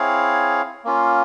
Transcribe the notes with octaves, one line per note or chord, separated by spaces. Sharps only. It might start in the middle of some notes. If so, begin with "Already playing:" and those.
Already playing: C4 E4 G#4 C#5 F5
A#3 C#4 F4